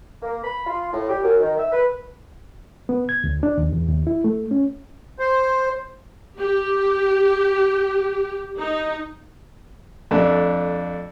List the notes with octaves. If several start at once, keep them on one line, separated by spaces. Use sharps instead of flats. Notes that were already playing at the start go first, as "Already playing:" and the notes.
A#3
B5
F4
A2
G4
F#2
D#3
E5
B4
B3
G#6
D2
D4
D#2
E2
D#2
E4
A3
C#4
C5
G4
D#4
F2 A3 D4